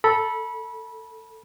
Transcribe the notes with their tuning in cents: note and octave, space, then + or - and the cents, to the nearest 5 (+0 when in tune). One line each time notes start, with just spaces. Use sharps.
A4 +0 B5 -25